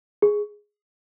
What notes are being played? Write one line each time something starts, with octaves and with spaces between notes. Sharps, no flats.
G#4